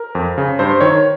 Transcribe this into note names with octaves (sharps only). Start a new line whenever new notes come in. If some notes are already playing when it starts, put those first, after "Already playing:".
Already playing: A#4
F2
C#3
G2 C5
D#3 C#5